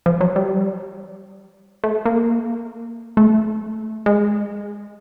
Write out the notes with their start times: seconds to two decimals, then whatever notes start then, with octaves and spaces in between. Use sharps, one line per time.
0.06 F3
0.21 F#3
0.36 G3
1.84 A3
2.05 A#3
3.17 A3
4.06 G#3